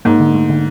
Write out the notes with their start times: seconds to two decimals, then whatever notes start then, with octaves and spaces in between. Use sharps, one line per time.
0.05 G#2 A#3
0.20 D3
0.35 A3
0.49 D3